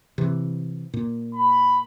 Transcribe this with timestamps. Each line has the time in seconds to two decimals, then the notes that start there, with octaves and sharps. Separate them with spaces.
0.18 C3 E3
0.94 A#2
1.34 B5